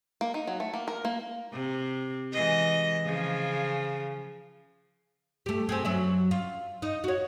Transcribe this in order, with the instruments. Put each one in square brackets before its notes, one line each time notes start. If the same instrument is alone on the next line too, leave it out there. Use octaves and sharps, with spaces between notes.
[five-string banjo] A#3
D#4
F#3
A3
A#3
A#4
A#3
[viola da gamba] C3
E3 G#3 D#5
C#3 F3
[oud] A3 G4
C4 G4 G#4
F#2 F#3 E5
F4
D#4
F#4 C#5